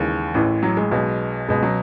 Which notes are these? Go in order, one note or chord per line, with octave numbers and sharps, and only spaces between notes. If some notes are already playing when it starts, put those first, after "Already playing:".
Already playing: D#2 C#3 E3 G#3
A1 A2 E3
F#3
G#3
B1 B2
C#2 B2 G#3
F#3